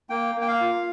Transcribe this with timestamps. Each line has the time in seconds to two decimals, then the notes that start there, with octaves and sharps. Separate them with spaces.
0.10 A#3 G5
0.35 A#3
0.41 G5
0.48 F5
0.61 F4